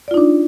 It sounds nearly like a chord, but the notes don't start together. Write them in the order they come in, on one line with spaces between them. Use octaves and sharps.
D5 F4 D#4 D4